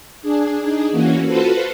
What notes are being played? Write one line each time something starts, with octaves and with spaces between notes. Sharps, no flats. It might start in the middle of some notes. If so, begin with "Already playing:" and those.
D4 G#4
D4 D#4 G#4
E3 A#3 C#4 F#4
F4 F#4 A4 B4 C5